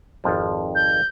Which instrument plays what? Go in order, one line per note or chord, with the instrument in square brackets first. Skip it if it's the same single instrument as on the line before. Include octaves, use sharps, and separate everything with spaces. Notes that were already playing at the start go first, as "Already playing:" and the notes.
[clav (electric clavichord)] G#1 F2 F3
[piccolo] G6